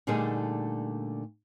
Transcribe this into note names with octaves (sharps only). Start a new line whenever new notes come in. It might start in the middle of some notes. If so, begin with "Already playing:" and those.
A#2 D3 G3 A3 D#4 G#4